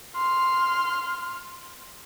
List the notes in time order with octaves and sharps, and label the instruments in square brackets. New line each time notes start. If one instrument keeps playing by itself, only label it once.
[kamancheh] C6 F6